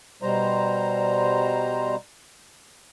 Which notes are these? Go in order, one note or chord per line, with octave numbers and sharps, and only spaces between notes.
B2 G3 C5 A#5